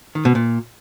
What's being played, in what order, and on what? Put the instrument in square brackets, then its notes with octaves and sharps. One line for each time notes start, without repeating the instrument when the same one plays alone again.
[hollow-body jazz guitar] D#3
B2
A#2